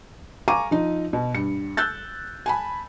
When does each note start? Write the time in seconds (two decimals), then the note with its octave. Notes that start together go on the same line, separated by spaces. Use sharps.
0.48 F5 G#5 A#5 C#6 D6 D#7
0.71 F3 D#4
1.13 B2
1.34 G2 C#7
1.77 E6 F#6 G6 A6
2.46 G#5 A5 B5